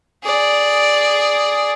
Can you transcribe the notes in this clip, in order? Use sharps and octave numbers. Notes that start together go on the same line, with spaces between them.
G#4 D5